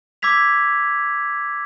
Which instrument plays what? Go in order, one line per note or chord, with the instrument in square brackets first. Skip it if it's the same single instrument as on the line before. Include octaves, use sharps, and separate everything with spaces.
[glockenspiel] D6 E6 G#6 B6 F7